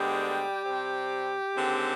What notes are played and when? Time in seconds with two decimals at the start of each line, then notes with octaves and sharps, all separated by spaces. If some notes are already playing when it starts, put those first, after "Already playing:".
Already playing: D2 D3 G3 G#3 B3 G4
0.63 C3 G3 C4
1.54 D#2 D3 G#3 C4